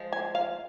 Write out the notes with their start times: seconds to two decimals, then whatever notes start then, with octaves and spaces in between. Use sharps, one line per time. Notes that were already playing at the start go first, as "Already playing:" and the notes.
Already playing: F3 G#3
0.12 G#5
0.35 F5